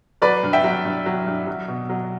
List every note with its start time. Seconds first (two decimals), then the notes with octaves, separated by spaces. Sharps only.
0.22 F#3 B4 D5
0.43 G2
0.53 E5 G5
0.64 F#3
0.85 G2
1.06 F#3
1.27 G2
1.47 F#3
1.68 B2
1.89 F#3